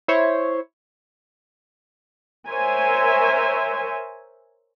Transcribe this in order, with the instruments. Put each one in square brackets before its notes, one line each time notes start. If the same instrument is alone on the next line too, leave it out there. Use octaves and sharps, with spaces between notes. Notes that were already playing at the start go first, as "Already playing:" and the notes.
[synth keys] E4 C5 C#5
[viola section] A#4 C5 C#5 E5 G#5